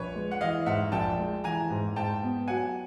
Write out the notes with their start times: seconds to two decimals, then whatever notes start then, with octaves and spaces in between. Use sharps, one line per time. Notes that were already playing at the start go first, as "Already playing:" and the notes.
Already playing: A#1 B4 C#5
0.15 G#3
0.31 F#5
0.41 E3 D#5 F5
0.66 G#2 E5 F#5
0.92 A#1 G5 A5
1.18 G#3
1.44 E3 G#5 A#5
1.70 G#2
1.96 G#2 G5 A5
2.23 B3
2.48 F#3 F#5 G#5